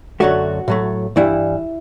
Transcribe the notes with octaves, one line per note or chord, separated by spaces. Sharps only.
F#2 D3 F#3 A3 F#4
A2 F#3 A3
G2 E3 G3 E4